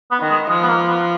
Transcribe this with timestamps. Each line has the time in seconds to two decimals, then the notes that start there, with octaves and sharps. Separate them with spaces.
0.11 B3
0.20 D#3
0.30 G#3
0.50 F3 G#3
0.62 B3
0.69 A#3
0.88 B3